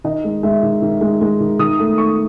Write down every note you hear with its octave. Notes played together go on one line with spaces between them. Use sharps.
D#3 D#5
G#3
G#3 E5
D#3
D#3
G#3
G#3
D#3
D#3 D#6
A3
A3 C#6